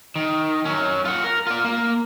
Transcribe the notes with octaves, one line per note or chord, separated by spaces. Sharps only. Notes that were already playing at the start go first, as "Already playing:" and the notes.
D#3
F#3 C#4
F4 F#5
A#4
F4 D5
A#3